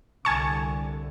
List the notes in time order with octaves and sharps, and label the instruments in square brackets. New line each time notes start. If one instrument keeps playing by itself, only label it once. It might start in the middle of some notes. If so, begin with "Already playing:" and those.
[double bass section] C2 D3 [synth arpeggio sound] G#5 A5 C#6